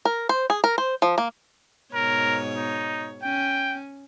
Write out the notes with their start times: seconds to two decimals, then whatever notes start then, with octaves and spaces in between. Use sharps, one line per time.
0.05 A#4
0.29 C5
0.50 G#4
0.64 A#4
0.78 C5
1.02 F3
1.18 A#3
1.94 G#2 B2 A#4 C#5
2.57 D#4
3.23 C#4 G5